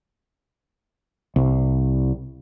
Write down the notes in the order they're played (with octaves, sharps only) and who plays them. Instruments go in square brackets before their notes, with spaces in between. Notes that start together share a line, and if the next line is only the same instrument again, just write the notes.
[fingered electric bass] C2